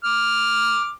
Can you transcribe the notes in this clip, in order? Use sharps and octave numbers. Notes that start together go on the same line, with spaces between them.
D6 F6